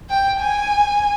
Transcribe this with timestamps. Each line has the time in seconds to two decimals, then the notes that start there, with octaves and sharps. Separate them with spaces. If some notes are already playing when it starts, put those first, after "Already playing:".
0.10 G5
0.40 G#5